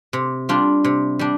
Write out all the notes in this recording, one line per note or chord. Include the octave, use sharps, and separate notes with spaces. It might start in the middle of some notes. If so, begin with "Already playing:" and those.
C3
G3 D4 F4
C3
G3 D4